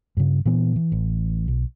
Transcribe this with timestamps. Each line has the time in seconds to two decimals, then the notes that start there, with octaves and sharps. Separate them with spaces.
0.17 G2 C#3
0.45 A#2 E3 B3
0.76 E3
0.92 A1
1.48 B1